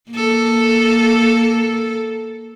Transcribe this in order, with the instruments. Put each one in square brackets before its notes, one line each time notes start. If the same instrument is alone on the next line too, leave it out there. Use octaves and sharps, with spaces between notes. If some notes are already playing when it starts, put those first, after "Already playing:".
[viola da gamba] A#3 A4